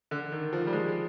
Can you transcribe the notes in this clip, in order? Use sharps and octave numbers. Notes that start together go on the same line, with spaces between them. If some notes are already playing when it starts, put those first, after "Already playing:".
D3
D#3
F3
G3
G#3